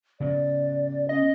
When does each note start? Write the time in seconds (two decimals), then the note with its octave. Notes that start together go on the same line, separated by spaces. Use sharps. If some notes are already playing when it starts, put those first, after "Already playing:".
0.20 C#3 B3 D5
1.09 C#4 D#5